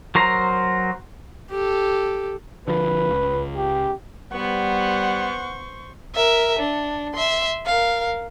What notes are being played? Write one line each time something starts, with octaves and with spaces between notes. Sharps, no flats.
F#3 A#4 C5 A#5
G4 A4
D3 F3 B4
C#2
G4
G3 B3 C5 F#5 C#6
A#4 E5
D4
E5 C6
A#4 F5